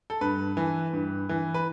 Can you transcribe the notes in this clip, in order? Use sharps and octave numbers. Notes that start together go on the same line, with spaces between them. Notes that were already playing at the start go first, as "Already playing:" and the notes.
A4
G2 B4
E3
G2
E3
B4